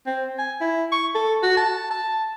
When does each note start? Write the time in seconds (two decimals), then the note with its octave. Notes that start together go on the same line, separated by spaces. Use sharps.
0.06 C4
0.39 G#5
0.61 E4
0.92 C#6
1.15 A4
1.43 F#4
1.57 A5
1.90 A5